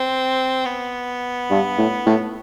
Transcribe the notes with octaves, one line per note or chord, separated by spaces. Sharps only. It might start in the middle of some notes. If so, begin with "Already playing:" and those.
Already playing: C4
B3
G2
A2
A2